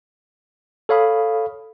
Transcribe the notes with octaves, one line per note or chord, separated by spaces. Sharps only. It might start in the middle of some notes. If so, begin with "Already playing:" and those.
A4 C#5 F5 B5 D#6